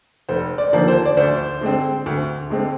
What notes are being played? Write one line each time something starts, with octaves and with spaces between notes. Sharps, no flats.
F1 C5
D5
D#2 D3 F3 A#3
C5
D5
D2 C5
D3 G#3 C4
D2
D3 G#3 C4